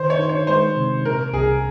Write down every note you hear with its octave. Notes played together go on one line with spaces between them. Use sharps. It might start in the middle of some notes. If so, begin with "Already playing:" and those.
Already playing: D#3 C5
C#5
D#4
C#5
G#3 C5
C3
A#2 A#4
C2 G#4